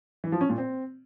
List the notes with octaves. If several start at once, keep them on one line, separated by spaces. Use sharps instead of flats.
E3
F3
C#4
A#2
C4